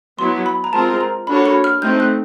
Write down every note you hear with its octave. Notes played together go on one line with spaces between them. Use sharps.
F#3 B3 E4 C6
B5
A#5
G#3 C4 F4 A#4 A5
A#5
A#3 D4 F#4 A4 C#5 B5
B5
F6
A3 C4 D#4 G6
F#6